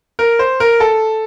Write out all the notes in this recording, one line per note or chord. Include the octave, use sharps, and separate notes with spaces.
A#4
C5
A#4
A4